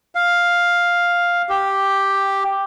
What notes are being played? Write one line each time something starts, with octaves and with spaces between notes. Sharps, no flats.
F5
G4